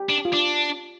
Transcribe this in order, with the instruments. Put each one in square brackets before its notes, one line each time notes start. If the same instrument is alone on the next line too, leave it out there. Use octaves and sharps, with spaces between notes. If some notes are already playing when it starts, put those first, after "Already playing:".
Already playing: [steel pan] G4
[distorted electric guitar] D4
[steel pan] F4
[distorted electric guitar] D4